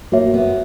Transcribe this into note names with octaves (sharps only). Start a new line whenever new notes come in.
A#3 F#4 C#5 E5
B3